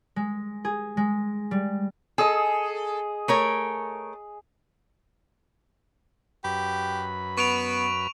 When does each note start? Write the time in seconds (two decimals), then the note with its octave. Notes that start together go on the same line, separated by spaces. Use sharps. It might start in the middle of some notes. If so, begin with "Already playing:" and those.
0.16 G#3
0.65 G#4
0.97 G#3
1.51 G3
2.18 G#4 A4 D#5
3.28 A3 A#4 C#5
6.44 F#2 G4 B4 B5
7.37 B3 C#6 D7 F7